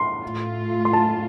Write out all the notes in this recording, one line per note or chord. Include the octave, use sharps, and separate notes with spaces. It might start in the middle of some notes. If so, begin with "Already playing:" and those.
Already playing: C6
A2 A3 F4
C6
A5